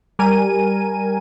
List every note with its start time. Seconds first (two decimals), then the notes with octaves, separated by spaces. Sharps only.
0.19 G3 A#4 G#5 D#7